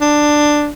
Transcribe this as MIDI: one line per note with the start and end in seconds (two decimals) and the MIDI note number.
0.01 0.69 62